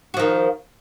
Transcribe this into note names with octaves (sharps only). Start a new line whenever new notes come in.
D#3 F3 F#4